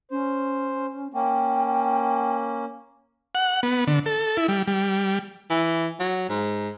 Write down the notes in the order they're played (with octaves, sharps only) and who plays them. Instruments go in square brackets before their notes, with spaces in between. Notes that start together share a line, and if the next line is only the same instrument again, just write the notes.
[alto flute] C#4 [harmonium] C5
[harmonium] A#3 C#4 [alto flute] G5
[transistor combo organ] F#5
B3
D3
A4
E4
G3
G3
[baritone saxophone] E3
F#3
G#2